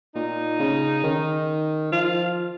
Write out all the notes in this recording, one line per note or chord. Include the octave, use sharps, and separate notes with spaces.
A#2 D#4
C#3
D#3
F3 F4